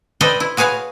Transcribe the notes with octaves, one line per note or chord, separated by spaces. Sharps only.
A4 B4 C5 D5 D#5 G5
E4
F#4 G#4 B4 C#5 F5